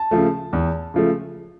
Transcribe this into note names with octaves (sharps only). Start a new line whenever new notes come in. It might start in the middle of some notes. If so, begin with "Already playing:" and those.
Already playing: A5
C#3 F3 A3
E2
C#3 F3 A3